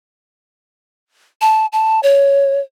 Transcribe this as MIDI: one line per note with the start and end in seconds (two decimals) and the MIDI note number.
1.41 1.66 81
1.73 2.00 81
2.03 2.60 73